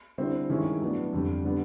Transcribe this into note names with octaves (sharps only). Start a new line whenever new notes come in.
D3 G3 C4 E4
G2 D#3 G#3 C#4 E4
A2 F#3 B3 D4
F2 D3 G3
D3 G3 B3